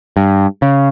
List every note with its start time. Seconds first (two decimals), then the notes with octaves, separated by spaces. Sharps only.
0.17 G2
0.62 C#3